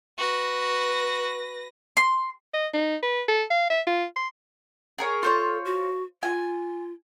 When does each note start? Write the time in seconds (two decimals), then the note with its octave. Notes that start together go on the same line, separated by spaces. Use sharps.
0.18 F#4 B4 A#6
1.97 C6
2.54 D#5
2.74 D#4
3.03 B4
3.28 A4
3.50 F5
3.70 E5
3.87 F4
4.16 C6
4.98 G#4 A#4 C#5
5.23 F4 A4 C5 C#5
5.65 F#4
6.23 F4 G#5